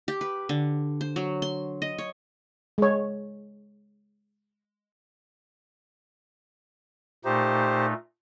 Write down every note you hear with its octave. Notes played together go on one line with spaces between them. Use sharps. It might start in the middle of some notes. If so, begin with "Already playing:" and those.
G4
B4
D3
C5
F#3
C6
D#5
C#5
G#3 C#5
A#2 A3 D#4 G4 C5